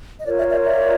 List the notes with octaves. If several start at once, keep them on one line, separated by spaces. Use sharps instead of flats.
D#5
F4 A#4 C#5 D5
D5 E5
D5 E5
D5 E5